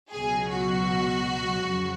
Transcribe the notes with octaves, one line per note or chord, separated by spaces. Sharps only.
C#2 B2 F#3 G#4
F#4
F2 C#3 F#3